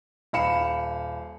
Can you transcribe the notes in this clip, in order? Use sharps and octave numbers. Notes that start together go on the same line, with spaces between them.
D#1 F5 B5 C#7 E7